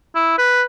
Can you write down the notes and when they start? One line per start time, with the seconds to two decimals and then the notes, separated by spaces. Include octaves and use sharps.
0.15 E4
0.38 B4